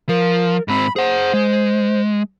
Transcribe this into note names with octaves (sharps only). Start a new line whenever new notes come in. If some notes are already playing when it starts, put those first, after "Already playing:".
F3 A#4
G#2 C4 B5
G#4 C5 F#5
G#3